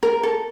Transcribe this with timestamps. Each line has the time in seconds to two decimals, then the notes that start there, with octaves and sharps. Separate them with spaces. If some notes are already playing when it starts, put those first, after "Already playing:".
0.03 A#4
0.23 A4